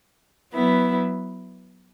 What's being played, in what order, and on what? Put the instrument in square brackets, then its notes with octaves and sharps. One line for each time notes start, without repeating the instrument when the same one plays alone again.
[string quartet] F#3 B3 E4 B4